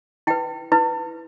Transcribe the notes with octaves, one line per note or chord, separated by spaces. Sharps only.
E4 B4 G5
E4 B4